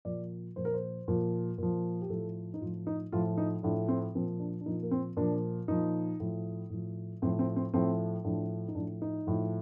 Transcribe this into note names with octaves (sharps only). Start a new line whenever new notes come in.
A#2 F3 D5
A#2 F3 C5
A#4
C5
A#2 F3
A#2 F3
G4
A2 F3 A4
D#4
A2 F3 F4
D#4
A2 F3 F4
D#4
A2 F3 D4
C4
A#2 F3 C4
D4
D4
A#2 F3 D#4
A#3
C4
A#2 F3 D4
A#2 F3 D#4
A2 F3
A2 F3
A2 F3 C4
C4
C4
A2 F3 C4
A2 F3 D4
D#4
A2 F3 D4
D#4
A2 F3